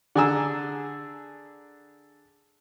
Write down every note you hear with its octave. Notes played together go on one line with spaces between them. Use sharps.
D3 G#4 G#5 A#5 E6